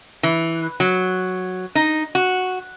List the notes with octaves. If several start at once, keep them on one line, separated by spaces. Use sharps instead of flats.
E3
F#3
D#4
F#4